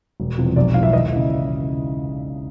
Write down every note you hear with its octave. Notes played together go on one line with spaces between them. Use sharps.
E1
E2 C3 F3
B1 D5
A2 F3 F5
E5
D#2 D#5
C#3 E3